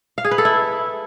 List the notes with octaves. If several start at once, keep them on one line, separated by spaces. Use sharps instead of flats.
F5
G#4
B4
A4
E4